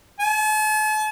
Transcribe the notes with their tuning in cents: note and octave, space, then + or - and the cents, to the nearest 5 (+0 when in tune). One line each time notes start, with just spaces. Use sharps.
A5 -45